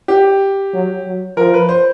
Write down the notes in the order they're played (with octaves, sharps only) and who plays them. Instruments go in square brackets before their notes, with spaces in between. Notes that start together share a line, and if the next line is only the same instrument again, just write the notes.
[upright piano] G4
[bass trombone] F#3
F#3
[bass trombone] F3 [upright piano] A#4
[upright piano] B4
C5